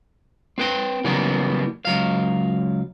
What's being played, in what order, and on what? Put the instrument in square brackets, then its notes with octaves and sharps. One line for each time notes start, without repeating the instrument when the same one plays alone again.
[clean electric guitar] C4 B4 G5
C#3 E3 F#3 G3 A#3 B3
C#2 F#3 F5